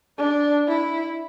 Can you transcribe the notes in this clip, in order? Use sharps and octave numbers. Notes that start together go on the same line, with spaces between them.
D4
E4